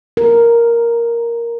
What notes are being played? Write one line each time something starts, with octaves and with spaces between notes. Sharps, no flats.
A#4